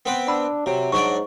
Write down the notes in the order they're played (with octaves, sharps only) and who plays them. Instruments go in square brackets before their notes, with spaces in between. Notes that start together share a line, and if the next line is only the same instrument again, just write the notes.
[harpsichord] B3 C4 B4
[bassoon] D4 [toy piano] F#5 B5 E6
[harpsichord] C3 [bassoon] F#3
[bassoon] G#2 [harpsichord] F#3 D4 D5 [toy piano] C#6